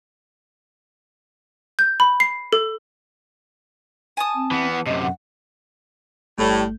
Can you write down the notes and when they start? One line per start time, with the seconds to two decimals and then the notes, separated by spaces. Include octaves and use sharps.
1.79 G6
2.00 B5
2.20 C7
2.53 A4
4.17 G#5 A5 D#6
4.35 C4
4.51 E3 B3
4.71 F#5
4.87 F#2 C3 D#5
5.02 F#5
6.39 G1 A2 G3 A3 G6